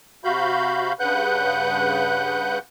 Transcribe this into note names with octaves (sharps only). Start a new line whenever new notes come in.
C3 F#4 F5 B5 G6
G2 C#3 B4 F#5 F#6 G6